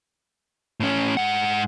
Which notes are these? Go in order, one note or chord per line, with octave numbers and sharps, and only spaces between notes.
A2 C#4
G#2 F#5